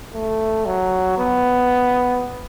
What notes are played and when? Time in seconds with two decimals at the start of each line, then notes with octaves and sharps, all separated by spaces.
0.14 A3
0.66 F#3
1.18 B3